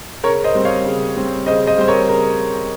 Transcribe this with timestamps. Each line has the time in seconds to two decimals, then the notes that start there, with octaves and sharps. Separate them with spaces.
0.24 C#3 A#4 C#5
0.44 C5 D#5
0.55 G3 C4
0.65 C#5 F5
0.85 C#3
1.16 G3 C4
1.46 C#3 C5 D#5
1.67 C5 D#5
1.78 G3 C4 C5
1.88 A#4 C#5
2.08 C#3 A#4